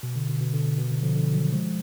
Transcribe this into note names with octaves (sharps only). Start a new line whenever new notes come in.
B2
D3
B2
B2
D3
B2
D3
D3 F3
D3
D#3 F#3
F3 G#3